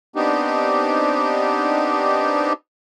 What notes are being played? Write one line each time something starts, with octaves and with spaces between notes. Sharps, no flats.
B3 C4 D4 D#4 G4